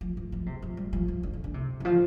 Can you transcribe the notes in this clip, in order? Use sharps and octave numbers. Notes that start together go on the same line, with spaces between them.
F3
F3
F3
C3
F3
G3
F3
F3
D3
D3
D3
C3
D3
F3